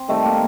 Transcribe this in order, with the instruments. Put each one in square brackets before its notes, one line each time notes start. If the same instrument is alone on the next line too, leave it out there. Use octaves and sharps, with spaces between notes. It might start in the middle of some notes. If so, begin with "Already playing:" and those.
Already playing: [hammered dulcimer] C4
C3 D#3 G3 A3
A#3